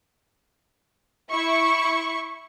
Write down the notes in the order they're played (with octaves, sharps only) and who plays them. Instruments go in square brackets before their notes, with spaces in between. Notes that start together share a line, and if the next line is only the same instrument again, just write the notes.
[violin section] E4 C#6